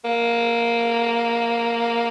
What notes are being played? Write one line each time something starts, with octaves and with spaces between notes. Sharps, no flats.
A#3